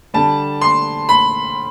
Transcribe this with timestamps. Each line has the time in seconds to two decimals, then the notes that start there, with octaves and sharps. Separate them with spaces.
0.14 D3 G3 A5
0.61 C6
1.09 B5